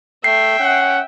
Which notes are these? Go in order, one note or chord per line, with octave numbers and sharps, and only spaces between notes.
A3 E5 G5 C7
C#4 F#5